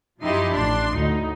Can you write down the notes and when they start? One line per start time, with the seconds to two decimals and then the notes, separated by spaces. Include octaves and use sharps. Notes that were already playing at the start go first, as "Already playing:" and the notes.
0.21 F#2 F3 D#4 E4 G4 C6
0.53 A1 D4 C6
0.93 D2 A2 D#4